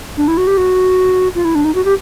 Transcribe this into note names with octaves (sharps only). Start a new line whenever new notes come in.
D4
E4
F#4
G4
F#4
F4
E4
D4
D#4
F#4
G4